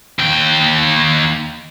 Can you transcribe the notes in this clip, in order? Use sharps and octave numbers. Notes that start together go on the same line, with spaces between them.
D#2 G5